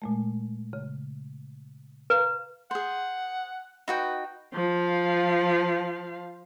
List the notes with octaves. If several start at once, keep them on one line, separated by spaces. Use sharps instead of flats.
A#2 G#3 A3
C#3
B4 F5 A#5
G#4 C5 F#5
D#4 F#4 B4 G5
F3 F5